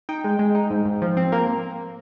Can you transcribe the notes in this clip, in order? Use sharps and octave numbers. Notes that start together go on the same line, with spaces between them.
D#4 G5
G#3
G#3
D#4
G#2
G#2
F3
C4
A#3 A#4